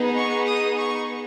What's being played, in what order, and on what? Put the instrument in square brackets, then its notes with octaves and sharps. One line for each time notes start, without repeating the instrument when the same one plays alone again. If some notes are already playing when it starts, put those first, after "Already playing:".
Already playing: [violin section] B3 D#4 G#4
C#6
D#6
C#6